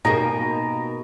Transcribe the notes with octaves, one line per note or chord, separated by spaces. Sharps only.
B2 A#3 D#4 G4 G#4 A#5